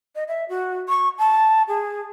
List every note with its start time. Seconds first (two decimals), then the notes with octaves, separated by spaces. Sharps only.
0.15 D#5
0.28 E5
0.49 F#4
0.89 C#6
1.19 A5
1.68 G#4